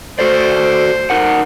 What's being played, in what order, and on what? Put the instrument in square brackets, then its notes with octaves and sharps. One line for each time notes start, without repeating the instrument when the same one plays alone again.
[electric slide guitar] F#4 A4 D5 [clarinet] C5
[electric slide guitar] D#4 A#4 F#5